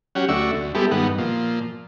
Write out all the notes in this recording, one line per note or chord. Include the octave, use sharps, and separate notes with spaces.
F#3 C#4 G4 F#5
D2 A3 D4 F#4 E5 C#6
D2
G3 G#3 B3 E4 G4 A4
G2 D#3 B3 F#5
A#2 F3